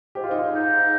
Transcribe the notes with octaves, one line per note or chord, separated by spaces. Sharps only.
G#2 G4
F4
D#4
F4
D#4